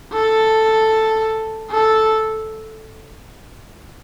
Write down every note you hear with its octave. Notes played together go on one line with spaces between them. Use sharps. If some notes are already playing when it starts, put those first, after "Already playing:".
A4
A4